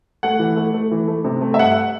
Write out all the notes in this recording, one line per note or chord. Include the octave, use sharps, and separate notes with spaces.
A3 F#5
E3
A3
A3
E3
A3
C3
A3
E5
G2 F#5